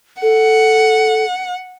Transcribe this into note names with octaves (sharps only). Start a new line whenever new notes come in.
A4 F#5